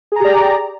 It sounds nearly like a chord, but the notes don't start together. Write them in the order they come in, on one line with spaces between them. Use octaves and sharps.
G#4 A#5 G4 D5